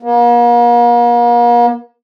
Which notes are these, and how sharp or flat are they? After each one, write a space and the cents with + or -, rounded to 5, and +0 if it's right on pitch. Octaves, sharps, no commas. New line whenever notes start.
A#3 +40